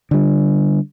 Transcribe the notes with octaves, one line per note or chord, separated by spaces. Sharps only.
D3 G3